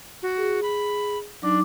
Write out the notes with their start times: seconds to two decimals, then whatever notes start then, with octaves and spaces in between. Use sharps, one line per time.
0.23 F#4
0.38 G#4
0.63 B5
1.42 F#3 D4 D#4 D6